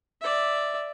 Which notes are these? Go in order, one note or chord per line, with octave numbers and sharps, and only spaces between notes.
D5 E5